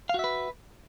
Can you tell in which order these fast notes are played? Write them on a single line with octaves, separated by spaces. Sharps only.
F5 F#4 E5 B4